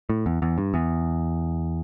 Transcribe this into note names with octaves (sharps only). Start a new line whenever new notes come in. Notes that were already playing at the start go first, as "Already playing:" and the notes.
A2
E2
E2
G2
E2